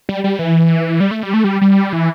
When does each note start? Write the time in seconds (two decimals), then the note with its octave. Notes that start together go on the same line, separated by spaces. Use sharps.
0.09 G3
0.24 G3
0.39 E3
1.00 G3
1.11 A3
1.23 G3
1.34 A3
1.44 G3
1.61 G3
1.93 E3